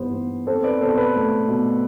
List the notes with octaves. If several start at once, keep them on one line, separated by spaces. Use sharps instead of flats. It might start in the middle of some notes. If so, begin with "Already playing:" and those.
Already playing: G2 E3 B3 C5
B3
C4 A4 C5
B4 D5
B2 A4 C5
B4
A3 A4
B2